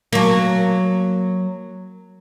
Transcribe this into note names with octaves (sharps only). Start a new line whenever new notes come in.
F#3 A#3